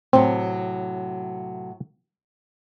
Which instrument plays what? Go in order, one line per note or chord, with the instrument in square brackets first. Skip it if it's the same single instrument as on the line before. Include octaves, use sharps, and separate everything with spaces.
[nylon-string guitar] A2 C3 F#3 [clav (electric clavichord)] C4